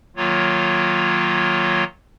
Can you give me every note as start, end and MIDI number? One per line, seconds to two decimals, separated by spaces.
0.16 1.84 51
0.16 1.84 54
0.16 1.84 58
0.16 1.84 65
0.16 1.84 73